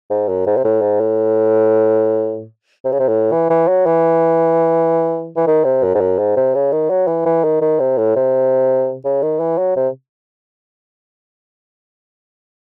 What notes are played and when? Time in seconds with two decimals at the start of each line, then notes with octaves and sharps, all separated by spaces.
0.10 G#2
0.29 F#2
0.46 G#2
0.57 C3
0.64 A2
0.81 G#2
1.00 A2
2.85 C3
2.92 C#3
3.00 C3
3.08 A2
3.32 E3
3.50 E3
3.68 F#3
3.86 E3
5.36 E3
5.47 D#3
5.65 C3
5.83 F#2
5.95 G#2
6.01 F#2
6.19 G#2
6.36 C3
6.55 C#3
6.73 D#3
6.90 F#3
7.07 E3
7.26 E3
7.44 D#3
7.62 D#3
7.80 C3
7.98 A2
8.16 C3
9.05 C#3
9.22 D#3
9.40 E3
9.58 F#3
9.76 C3